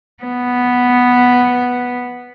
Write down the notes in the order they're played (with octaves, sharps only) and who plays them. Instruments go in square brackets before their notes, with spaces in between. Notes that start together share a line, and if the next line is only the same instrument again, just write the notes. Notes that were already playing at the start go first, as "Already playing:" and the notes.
[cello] B3